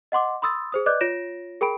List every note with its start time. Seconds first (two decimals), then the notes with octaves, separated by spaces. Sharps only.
0.12 D#5 F#5 C6 D6
0.42 B5 C6 D#6 E6 A6
0.72 G#4 C5 D#6
0.86 B4 D5 D#5 D6 F#6 G6
1.01 F4 C#5 A#6 D7 E7
1.61 G#4 A#4 G5 B5 D7